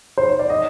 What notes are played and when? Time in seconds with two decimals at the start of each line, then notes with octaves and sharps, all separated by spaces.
0.18 C5
0.28 C#5
0.39 D5
0.50 D#5